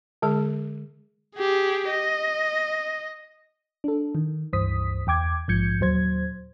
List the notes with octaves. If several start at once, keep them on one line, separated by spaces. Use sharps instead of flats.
D3 G#3 G#4
G4 G#4
D#5
D4 A4
D#3
C#2 G2 E3 C5 D#6 B6
E2 G5 D6 G#6
A#1 G#2 F3 G6 G#6 C#7
D#2 A#2 F#3 C5 G#6